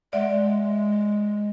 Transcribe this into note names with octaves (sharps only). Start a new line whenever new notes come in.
G#3 D5 E5 F#5